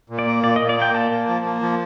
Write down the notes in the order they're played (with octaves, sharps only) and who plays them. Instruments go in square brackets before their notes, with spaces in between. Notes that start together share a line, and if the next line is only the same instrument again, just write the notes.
[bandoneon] A#2
[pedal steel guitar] D5
[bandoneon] A#3
[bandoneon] A#2 [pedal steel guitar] D5
[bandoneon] A#2 [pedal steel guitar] D#5
[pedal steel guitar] D5
[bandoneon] A#3 [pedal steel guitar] G5
[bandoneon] A#2 [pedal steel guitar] A5
[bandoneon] A#3
F3
A#3
F3